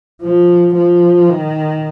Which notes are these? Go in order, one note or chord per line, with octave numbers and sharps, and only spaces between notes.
F3
F3
D#3